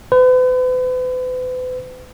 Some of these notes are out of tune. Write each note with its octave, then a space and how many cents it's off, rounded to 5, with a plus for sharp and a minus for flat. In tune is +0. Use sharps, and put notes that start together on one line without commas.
B4 +45